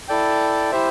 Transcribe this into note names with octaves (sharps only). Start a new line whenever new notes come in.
E4 A4 D5 G5
E4 G4 C5 E5